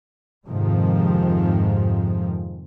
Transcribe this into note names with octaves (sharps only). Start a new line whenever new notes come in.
F2 G#2 C3 D#3 F3